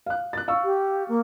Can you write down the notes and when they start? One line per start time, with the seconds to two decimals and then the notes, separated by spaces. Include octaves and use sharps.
0.06 F5 F#6
0.33 F#6 A6
0.48 F5 C#6 E6
0.64 G4
1.08 A#3